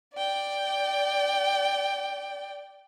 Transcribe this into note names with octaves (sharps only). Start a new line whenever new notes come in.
D5 G5